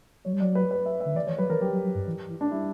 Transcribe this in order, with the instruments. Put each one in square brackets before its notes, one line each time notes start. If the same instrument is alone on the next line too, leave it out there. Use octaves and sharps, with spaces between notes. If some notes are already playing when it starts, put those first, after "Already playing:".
[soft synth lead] F#3 [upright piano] C#5
[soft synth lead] G3
[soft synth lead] F#3 [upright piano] D5
[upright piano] B4
B4
E5
[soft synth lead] D3 [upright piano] E5
[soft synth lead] E3 [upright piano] D5
[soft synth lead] E3 [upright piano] C#5
[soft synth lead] F#3 [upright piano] B4
[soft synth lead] E3 [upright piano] A#4
[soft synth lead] F#3 [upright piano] G4
[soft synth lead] F#3
F#3
G2
E3
E3
[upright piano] D4
[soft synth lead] G3 [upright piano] E4